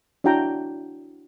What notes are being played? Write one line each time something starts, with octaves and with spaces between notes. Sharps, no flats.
D4 E4 F#4 G5 A#5